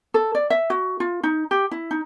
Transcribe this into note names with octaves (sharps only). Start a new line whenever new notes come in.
A4
D5
E5
F#4
F4
D#4
G4
E4
D#4